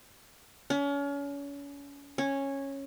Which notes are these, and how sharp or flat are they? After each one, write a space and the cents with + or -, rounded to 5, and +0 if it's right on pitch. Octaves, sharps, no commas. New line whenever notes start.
C#4 +35
C#4 -10